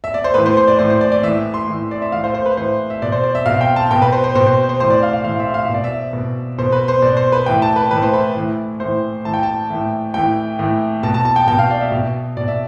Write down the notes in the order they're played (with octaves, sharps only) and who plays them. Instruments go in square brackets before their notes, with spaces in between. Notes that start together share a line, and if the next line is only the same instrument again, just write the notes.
[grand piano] E5
D5
C5
A2 E3 B4
C5
C5
D5
A2 E3 C5
C5
D5
D5
A2 E3 E5
C6
A2 E3
D5
E5
A2 E3 F5
C5
C5
B4
A2 E3 C5
E5
B2 D5
C5
D5
E5
B2 F5
G5
A5
B2 G5
B4
C5
C5
B2 C5
C5
C5
A2 E3 C5
D5
F5
F5
A2 E3 F5
E5
F5
B2 E5
D5
E5
B2
B2 C5
B4
C5
B2 D5
C5
B4
A2 E3 G5
A5
B4
A2 E3 B4
C5
B4
A2 E3
A2 E3 C5
A2 E3 A5
G5
A5
A2 E3
A2 E3 G5
A2 E3
B2 A5
A5
A5
G5
B2 G5
F5
D5
E5
B2
B2 D5
E5